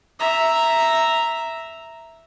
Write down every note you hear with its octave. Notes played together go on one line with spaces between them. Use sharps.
E5 A#5